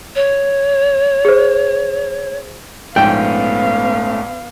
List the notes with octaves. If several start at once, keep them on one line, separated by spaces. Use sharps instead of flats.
C#5
G#4 C5
A#1 G#2 A3 B3 C#4 F5 G5